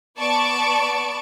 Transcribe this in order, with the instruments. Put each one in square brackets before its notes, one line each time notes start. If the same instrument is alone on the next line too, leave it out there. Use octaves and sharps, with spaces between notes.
[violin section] B3 D5 A5 C#6 D7